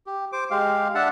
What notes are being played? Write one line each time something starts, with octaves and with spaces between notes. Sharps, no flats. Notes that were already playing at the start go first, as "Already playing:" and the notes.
G4
C5 D6
G#3 G4 F5
D4 E5 F#5 A5